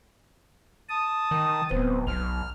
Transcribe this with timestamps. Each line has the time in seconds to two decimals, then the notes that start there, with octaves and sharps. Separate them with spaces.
0.89 A5 D#6
1.31 D#3
1.71 D1 B3 C4
2.07 B1 F6